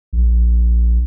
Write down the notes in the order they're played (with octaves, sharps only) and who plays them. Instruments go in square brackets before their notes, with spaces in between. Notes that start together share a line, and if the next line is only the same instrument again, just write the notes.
[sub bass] A#1